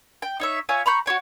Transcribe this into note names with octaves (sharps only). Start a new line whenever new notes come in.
G5
D#4 C#5 E5
F4 C#5 E5 G#5
A#5 B5 C#6 G6
F#4 G4 C#5 G5